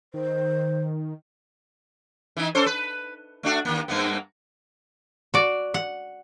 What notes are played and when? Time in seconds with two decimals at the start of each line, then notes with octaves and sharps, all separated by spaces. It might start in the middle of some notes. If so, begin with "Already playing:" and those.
0.14 D#3 C5
2.37 E3 D#4
2.55 C#4 A4 C5
2.66 B4
3.43 A3 D4 F#4
3.65 D#2 A#3
3.88 G2 A#3 B3
5.34 F#4 D5
5.74 F#5